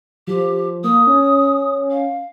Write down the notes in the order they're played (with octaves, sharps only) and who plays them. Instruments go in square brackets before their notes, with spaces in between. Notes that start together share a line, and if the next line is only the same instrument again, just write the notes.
[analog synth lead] F3 [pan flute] G4
[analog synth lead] A#3 [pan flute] D#6
[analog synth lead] C#4
[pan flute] F5